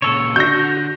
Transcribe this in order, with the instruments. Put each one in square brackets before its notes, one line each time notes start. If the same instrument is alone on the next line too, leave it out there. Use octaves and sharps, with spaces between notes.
[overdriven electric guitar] A#2 C#3 [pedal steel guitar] A4 C#5
[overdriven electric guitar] D3 [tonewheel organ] F#4 [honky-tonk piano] G6 A#6